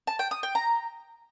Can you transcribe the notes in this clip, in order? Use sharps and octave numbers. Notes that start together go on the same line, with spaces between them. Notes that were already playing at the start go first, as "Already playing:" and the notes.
A5
G5
D#6
G5
A#5